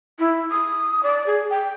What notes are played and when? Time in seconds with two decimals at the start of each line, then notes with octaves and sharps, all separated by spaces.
0.19 E4
0.51 D#6
1.03 D5
1.27 G#4
1.50 G5